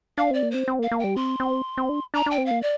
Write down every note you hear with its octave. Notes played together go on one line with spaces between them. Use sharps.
D4 F5
C4 D5
A#3
C4 C5
C4
A#3
F5
A#3
G3 G5
C4 C6
C4
C4
D4
D4 A#5
D4 G5
C4
F5
A#3
D5